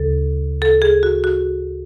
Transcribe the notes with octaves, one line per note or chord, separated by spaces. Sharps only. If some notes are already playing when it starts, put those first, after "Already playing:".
Already playing: D2 C#3 A4
A4
G#4
F#4
F#4